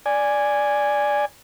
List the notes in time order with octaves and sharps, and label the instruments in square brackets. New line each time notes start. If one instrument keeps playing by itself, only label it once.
[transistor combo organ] D5 G#5